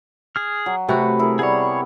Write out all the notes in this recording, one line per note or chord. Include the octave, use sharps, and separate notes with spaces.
G#4 F6
F#3
C3 A3 F#4 B4 C#6
E4 G#4 A#4
G3 B3 G#4 C#5